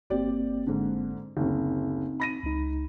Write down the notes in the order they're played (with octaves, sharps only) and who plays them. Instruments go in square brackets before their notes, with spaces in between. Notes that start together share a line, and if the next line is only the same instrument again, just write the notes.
[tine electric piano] G1 A#3 C4 [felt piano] G4 D5
[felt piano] G#2 D3
[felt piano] F#1 D2 [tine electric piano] C4 D#4
[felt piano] B5 A#6 D#7
[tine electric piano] C#2 D#4